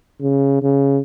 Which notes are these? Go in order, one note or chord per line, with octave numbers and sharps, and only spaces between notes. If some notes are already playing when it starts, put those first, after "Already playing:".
C#3
C#3